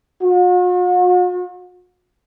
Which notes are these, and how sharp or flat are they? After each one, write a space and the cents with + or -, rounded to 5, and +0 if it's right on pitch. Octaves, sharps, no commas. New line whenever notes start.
F#4 -45